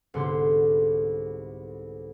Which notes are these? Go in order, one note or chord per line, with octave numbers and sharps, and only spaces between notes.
C2 G#2 D3 B3 C6 D6